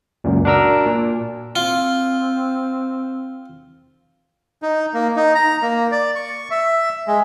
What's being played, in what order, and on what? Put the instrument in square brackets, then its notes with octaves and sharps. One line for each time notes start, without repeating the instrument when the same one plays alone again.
[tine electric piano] C#2 F#2 A#2
D4 F#4 A#4 A#5 E6
A#2
[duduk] C4 [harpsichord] F4
[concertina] D#4
A#3
D#4
A#5
A#3
D5
C#6
E5
G#3